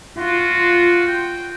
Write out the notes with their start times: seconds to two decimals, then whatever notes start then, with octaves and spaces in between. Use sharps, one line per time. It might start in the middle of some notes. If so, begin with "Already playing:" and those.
0.17 F4 F#4
1.08 G5